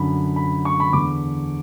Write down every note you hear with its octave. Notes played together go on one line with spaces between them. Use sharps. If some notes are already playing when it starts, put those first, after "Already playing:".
Already playing: F#2 D3 B5
B5
C#6
B5
E2 D3 D6